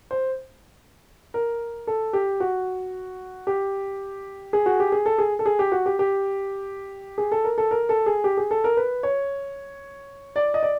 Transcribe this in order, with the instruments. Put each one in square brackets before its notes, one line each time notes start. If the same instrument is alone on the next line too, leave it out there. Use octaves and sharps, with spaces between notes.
[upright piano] C5
A#4
A4
G4
F#4
G4
G#4
F#4
G4
G#4
A4
G#4
A4
G#4
G4
F#4
G4
G4
G#4
A4
A#4
A4
A#4
A4
G#4
G4
G#4
A4
A#4
B4
C#5
D5
D#5
D5